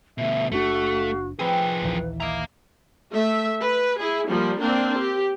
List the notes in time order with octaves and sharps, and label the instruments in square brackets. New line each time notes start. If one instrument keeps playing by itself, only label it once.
[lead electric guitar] D2 B2 [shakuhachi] E5
[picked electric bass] F#1 D4 [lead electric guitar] A3 [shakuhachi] F#4
[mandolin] F5
[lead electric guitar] F3 G#4 [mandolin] C4 A#4 B5 [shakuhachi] B4
[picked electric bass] A#1 D#2 E3
[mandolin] E4 D#5 D6 [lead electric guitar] F5 A#5
[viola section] A3 E5
B4
E4 G#4
F3 G3 A#3
A#3 C4 D4
G4